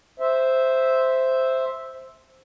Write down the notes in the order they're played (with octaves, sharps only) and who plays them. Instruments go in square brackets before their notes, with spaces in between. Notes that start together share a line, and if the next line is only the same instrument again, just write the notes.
[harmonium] C5 E5